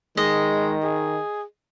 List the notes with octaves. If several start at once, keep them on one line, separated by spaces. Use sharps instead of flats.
D#3 G#3 D#5
G#4